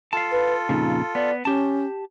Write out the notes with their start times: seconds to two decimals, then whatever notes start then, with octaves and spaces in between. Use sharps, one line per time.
0.13 F4 A4 F5 A5
0.32 B4
0.69 F2 A#2 C#3 D#4
1.15 B3 D5
1.45 C#4 G4 A5